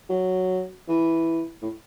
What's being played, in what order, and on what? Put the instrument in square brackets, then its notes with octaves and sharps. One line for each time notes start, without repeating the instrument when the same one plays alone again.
[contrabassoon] F#3
E3
A2